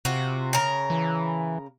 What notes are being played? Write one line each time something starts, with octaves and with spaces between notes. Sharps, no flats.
C3 F4 F#4
C#3 A#4
E3